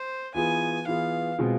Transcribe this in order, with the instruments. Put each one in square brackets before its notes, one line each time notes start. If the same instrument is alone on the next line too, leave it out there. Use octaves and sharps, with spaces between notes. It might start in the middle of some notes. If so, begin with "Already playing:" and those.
Already playing: [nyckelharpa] C5
[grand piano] E3 B3 F4 G#4 [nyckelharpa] G#5
[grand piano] E3 B3 F4 G#4 [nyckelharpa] F5
[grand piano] B2 G#3 C4 F4 G#4